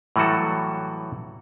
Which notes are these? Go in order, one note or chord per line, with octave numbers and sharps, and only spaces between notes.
A2 E3 F#3 G3 F#4 A4